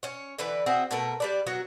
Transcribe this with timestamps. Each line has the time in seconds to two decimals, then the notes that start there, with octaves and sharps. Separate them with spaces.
0.03 C#4 C#5
0.38 D3 E3 B4 D5
0.66 C4 E4 F#4 G#4
0.91 B2 A3 A#4 B4
1.20 G3 B4 D5
1.47 F#3 B3 F#4